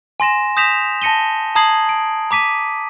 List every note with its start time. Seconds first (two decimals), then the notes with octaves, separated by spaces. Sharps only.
0.20 G#5 C6 A#6 E7
0.57 D#6 G6 A#6 B6 E7 F7
1.02 A5 A#6 C#7 D#7 G7
1.55 A5 A#5 D#6 G#6 C7 F#7
1.89 D7
2.31 A#5 D6 B6 D#7